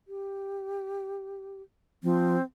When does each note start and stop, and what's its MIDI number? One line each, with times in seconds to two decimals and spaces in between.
0.08 1.62 67
2.03 2.37 53
2.03 2.42 60